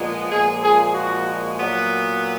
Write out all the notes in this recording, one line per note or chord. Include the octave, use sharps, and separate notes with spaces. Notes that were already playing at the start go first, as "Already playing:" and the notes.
Already playing: A#2 F3 G#3 B3
A#2 F3 G#3 G#4
G#4
F#4
A#2 F#3 B3